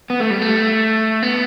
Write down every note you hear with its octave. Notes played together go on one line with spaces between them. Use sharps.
B3
A3
G3
A3
B3